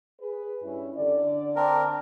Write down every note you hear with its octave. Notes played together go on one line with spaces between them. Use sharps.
G#4 B4
G2 C#4 E4
D3 D5
C4 D4 A#4